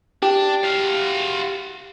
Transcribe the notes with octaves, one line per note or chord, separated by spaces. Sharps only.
D4 G4
F#4 F5